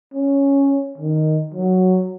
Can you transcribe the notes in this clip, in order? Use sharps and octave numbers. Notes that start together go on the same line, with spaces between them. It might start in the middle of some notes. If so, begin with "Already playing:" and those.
C#4
D#3
F#3